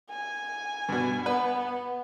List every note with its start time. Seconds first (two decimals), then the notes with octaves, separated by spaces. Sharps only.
0.11 G#5
0.89 G2 B2
1.26 B3 B4